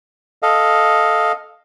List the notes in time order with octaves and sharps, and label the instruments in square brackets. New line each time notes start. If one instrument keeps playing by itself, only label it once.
[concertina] A4 D#5 F5